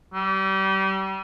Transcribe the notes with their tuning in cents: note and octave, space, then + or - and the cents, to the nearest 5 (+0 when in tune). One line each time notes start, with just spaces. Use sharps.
G3 -30